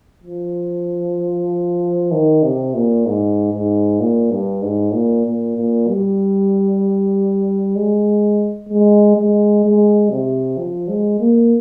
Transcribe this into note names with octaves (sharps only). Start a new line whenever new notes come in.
F3
D#3
C3
A#2
G#2
G#2
A#2
G2
G#2
A#2
A#2
A#2
G3
G#3
G#3
G#3
G#3
C3
F3
G#3
A#3